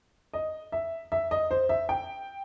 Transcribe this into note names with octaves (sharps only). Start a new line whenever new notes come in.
D#5
E5
E5
D#5
C5
E5
G5